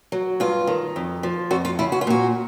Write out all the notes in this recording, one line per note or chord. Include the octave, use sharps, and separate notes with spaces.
F#3
G2 F4
D#3
F2
F3
F2 F#4
F4
C#3 E4
F#4
F4
A#2 F#4